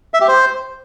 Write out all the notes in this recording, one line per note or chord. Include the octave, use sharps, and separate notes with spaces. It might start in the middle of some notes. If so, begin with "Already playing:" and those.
E5
G4
C5